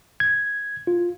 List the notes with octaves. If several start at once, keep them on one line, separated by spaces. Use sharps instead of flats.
G#6
F4